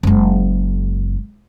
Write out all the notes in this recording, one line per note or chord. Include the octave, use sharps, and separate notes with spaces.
F#1 G#3